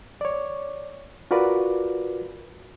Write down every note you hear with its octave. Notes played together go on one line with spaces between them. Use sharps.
C#5 D5
F4 F#4 A#4 B4 D5